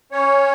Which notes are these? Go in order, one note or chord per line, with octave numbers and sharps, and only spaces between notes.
C#4 C#5